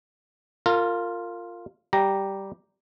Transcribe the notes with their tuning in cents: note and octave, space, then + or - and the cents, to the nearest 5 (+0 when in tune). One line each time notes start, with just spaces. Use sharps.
F4 +0 A#4 -30
G3 -5 G4 +0 A#5 +0